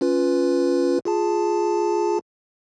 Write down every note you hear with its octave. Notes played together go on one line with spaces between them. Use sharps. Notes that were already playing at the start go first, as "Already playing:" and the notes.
C#4 F4 B4
F4 G#4 A5